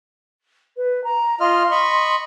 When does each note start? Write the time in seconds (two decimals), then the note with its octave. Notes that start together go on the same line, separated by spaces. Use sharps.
0.77 B4
1.04 A#5
1.40 F4 D#5 C6 F6
1.71 D#5 B5 C#6